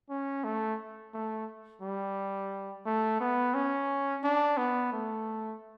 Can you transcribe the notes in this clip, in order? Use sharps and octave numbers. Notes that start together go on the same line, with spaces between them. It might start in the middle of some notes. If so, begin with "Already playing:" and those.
C#4
A3
A3
G3
A3
B3
C#4
D4
B3
A3